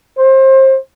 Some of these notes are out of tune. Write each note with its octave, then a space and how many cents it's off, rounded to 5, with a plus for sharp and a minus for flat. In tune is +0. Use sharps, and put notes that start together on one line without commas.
C5 +30